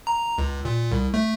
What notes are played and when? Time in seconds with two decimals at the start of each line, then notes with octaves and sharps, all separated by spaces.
0.07 A#5
0.38 C#2
0.65 A#2
0.91 C2
1.14 A3